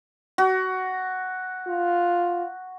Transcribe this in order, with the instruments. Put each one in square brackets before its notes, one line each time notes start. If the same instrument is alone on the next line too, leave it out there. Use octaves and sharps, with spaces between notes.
[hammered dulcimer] F#4
[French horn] F4